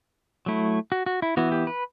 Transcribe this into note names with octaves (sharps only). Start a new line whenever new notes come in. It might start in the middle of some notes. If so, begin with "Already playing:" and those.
F#3 A3 E4
F#4
F#4
E4
E3 B3 E4 F#4
G4
B4